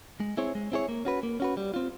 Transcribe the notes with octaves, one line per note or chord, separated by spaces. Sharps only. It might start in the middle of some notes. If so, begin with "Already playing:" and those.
G#3
C4 E4 G#4 C#5
G#3
C4 E4 G#4 C#5
A#3
C#4 F#4 B4
A#3
C#4 F#4 B4
G3
C4 F4